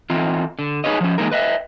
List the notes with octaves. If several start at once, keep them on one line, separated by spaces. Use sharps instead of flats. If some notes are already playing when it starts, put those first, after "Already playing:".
E3 C4 D#4 F4
D3
D#4 G#4 B4 C#5 D#5
F3 C#4
E3 G#3 A#3 D#4 A#4
B4 D#5 E5